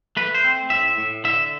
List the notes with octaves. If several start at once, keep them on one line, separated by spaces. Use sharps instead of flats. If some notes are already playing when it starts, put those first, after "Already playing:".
A3 B4
C5
C4
A2 E5
A2
D3 E5